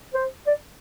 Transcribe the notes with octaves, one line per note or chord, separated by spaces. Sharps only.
C5
D5